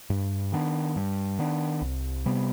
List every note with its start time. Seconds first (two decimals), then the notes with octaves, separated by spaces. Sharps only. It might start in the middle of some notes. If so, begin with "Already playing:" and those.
0.10 G2
0.52 D#3 B3 D4
0.96 G2
1.39 D#3 B3 D4
1.82 C2
2.26 C3 G3 B3